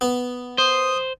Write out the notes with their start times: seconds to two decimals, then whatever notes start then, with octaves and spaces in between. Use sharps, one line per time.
0.01 B3
0.58 C5 D#6